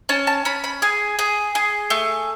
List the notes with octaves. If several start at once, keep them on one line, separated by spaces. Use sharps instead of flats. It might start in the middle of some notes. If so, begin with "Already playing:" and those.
C#4 A5
A5
C#4 B5
B5
G#4 G#5
G#4
G#4
A3